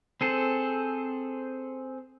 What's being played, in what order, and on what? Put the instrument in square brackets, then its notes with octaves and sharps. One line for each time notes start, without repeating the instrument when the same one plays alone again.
[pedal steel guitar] C4 G#4 A4 C5